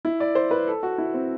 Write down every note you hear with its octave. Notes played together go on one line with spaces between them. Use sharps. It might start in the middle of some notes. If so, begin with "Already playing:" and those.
E4
D5
C5
B4
A4
F#4
E4
C4